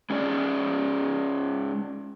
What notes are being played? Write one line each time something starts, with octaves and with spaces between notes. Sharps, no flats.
G#3 C#4 G#4 D5